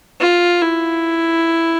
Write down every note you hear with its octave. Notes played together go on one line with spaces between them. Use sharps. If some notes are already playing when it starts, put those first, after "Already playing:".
F4
E4